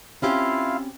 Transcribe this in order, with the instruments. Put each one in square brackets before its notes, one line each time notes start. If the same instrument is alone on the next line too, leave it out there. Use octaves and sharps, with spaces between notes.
[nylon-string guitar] C4 C#4 G4 [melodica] E4 F4 F5